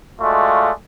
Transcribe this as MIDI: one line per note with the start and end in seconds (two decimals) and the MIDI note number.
0.21 0.70 56
0.21 0.70 57
0.21 0.70 65
0.21 0.70 66
0.21 0.70 74
0.21 0.70 77